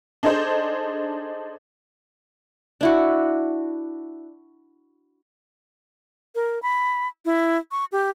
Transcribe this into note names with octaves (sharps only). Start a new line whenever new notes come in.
D4 D#4 G#4 A4 C5
D4 E4 F#4
A#4
B5
E4
C#6
G4